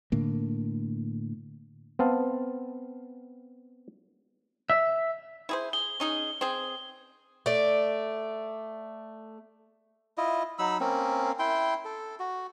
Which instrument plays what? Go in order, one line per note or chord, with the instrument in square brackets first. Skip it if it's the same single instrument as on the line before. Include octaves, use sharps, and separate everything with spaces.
[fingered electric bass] A2 D3 A#3
[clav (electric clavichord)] B3 C4 F5 A5
[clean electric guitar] E5
[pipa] E4 G#4 C5
[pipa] G#4 [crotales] G7
[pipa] C#4 D#4 G#4
C4 G#4
[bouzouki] A3 D5
[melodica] E4 F4 D#5
F#3 D#4 B5 E6
A#3 C4 C#4
E4 G5 C6
A4
F#4